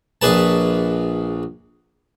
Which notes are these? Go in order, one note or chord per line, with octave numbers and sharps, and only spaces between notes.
A#1 G#4 B4 A5